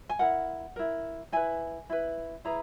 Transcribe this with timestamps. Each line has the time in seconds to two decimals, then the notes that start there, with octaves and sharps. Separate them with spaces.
0.09 G#5
0.19 E4 A#4 F#5
0.76 E4 A#4
1.32 E4 B4 G#5
1.90 E4 B4
2.45 E4 G#4 B4 A#5